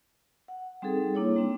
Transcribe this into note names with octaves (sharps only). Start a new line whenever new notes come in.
F#5
G3 C4 D#4 G#4 A4
A#3 D4 E4 C#5
G3 C4 D4